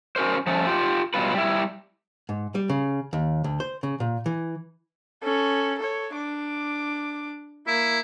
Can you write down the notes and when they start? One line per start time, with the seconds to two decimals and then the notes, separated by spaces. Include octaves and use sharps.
0.16 C#4 F#4 A#4 C5
0.47 F3 A3 C#4
0.67 F4 G4
1.14 B2 F#3 G3 F4 B4
1.34 G3 E4
2.29 G#2
2.55 G3
2.69 C#3
3.13 D#2
3.44 D2
3.60 C5
3.83 C#3
4.00 A#2
4.26 E3
5.23 C#4 A4
5.79 A4 C#5
6.13 D4 D6
7.67 A#3 E4